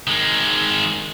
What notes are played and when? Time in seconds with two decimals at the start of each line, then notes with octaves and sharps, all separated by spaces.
0.07 D#3 G#3